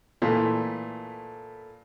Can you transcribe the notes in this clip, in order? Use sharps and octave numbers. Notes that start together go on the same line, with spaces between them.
A#2 E3 A3